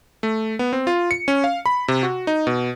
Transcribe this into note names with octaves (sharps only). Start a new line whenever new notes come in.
A3
B3
C4
F4
C#7
C#4
F5
B5
C3
F#4
D#4
B2